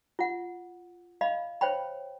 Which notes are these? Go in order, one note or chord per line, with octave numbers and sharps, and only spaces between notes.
F4 F#5
D#5 F5 B5
C5 C#5 G5 B5